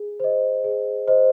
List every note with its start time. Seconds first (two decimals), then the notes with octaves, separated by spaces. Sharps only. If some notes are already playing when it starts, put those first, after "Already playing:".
Already playing: G#4
0.20 C5 D#5
0.64 G#4
1.08 C5 D#5